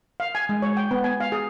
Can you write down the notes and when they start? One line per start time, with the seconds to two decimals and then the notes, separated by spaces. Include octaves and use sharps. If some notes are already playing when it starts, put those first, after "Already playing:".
0.20 F5
0.35 G#5
0.49 G#3
0.62 C#5
0.77 G5
0.91 B3
1.04 G#5
1.20 F5
1.32 G#4